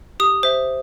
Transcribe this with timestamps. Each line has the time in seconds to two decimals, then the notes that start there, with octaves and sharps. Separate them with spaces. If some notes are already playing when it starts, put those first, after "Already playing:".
0.20 G4 D#6
0.43 C5 E5